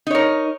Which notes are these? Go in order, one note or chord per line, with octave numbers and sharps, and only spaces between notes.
D#4 A#4 C#5